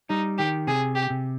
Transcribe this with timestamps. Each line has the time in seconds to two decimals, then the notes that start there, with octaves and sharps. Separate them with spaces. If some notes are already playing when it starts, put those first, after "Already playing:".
0.09 G3 D#4
0.38 D#3 G4
0.67 C3 G#4
0.95 G4
1.10 C3